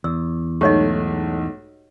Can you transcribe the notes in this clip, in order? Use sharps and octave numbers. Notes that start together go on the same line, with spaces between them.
E2 E6
B1 G#2 A3 G4 C#5 D#5